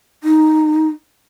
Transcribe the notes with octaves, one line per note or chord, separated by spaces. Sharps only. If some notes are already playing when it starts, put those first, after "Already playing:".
D#4